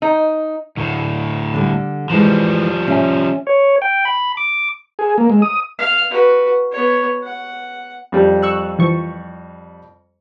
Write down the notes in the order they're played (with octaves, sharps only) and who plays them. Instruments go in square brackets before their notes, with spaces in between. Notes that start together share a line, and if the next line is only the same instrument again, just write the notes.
[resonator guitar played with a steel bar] D#4
[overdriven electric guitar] D2 A2
[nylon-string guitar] D3 G3
[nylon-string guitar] E3 G#3 [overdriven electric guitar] F3 G3
[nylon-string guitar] C#4 E5 G#5
[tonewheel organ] C#5
G5
B5
D6
[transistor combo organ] G#4
A#3
G#3
D#6
[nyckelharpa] F5
F#4 B4
B3 C#5
F#5
[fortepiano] F2 G3 G4
[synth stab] C#6 E6 F#6
E3 F3 C#6